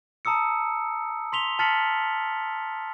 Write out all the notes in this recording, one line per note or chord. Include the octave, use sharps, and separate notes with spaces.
A5 A#5 D#6 E6 C#7
C6 B6 F7 G7
A5 F6 A6 B6 C#7 F#7